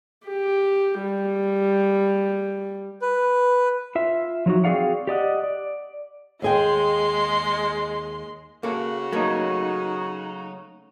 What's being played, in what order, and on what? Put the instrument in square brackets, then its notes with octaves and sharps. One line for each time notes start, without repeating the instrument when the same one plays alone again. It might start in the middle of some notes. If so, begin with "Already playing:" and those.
[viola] G4
G3
[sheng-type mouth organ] B4
[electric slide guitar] F4 E5
F3 F#3 D#4 F#4
C4 F#4 G#4 D5 F5 F#5
G4 D5 D#5 F#5
D5
[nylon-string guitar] D#2 G#4 G5 [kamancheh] G#3 C6
[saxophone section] C#3 F#4 [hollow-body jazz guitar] A#3 A4
[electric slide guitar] F#3 D#4 [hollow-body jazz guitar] A3 A#3